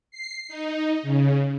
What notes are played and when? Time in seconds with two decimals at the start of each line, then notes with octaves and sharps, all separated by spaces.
0.11 C7
0.49 D#4
1.03 C#3